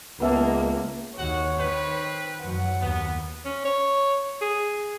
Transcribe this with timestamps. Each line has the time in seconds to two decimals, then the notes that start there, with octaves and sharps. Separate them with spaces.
0.20 C#2 G#3 A#3 B3 E5 A5
1.18 D#2 F#4 C#5 F#5
1.58 D#3 C4 B4
2.42 F#2 F#3 F#5
2.81 D#2 B3
3.45 C#4
3.65 C#5
4.41 G#4